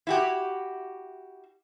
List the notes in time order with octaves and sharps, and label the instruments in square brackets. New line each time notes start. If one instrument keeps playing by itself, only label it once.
[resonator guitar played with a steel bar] E4 F#4 G4